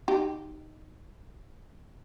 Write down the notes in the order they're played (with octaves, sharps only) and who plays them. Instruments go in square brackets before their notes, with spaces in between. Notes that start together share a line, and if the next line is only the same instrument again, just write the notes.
[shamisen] D#4 G4